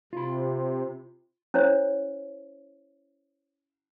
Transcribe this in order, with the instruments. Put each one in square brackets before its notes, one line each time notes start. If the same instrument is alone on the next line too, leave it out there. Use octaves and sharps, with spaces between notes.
[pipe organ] C3 [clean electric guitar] F4 B5
[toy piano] C#4 E4 C5 C#5